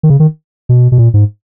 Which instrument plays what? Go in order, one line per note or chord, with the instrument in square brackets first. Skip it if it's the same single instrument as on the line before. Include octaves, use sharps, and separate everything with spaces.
[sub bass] D#3
C#3
D#3
B2
B2
A#2
G#2